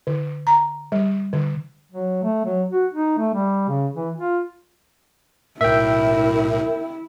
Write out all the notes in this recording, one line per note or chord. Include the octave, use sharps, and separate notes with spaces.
D3
A#5
G3
D3
F#3
A3
F#3
F#4
D#4
A3
G3
C#3
E3
F4
B1 A2 E4 A#4 E5 G5